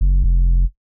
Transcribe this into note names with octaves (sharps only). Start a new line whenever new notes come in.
F#1
F1